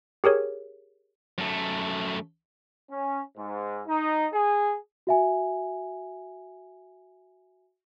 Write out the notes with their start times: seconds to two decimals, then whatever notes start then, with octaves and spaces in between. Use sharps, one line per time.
0.24 G4 G#4 A#4 C#5
1.38 F#2 A3
2.91 C#4
3.37 G#2
3.87 D#4
4.33 G#4
5.07 F#4 E5 G#5